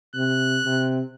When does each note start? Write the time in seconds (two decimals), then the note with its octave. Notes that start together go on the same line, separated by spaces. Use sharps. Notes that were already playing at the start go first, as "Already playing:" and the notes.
0.15 C3 F#6
0.65 C3